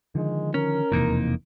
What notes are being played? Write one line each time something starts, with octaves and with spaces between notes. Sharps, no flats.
D3 D#3 F3 G#3
C#4 A#4
E1 F2 C3 E3 A#3 D#4